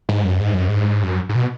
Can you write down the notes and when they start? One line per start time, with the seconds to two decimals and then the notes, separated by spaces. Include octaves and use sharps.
0.09 G#2
0.24 F#2
0.40 G#2
0.54 F#2
0.68 G#2
1.03 F#2
1.29 G#2
1.35 B2